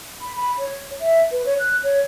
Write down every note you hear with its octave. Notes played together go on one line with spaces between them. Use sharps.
B5
B5
C#5
E5
B4
C#5
F#6
C#5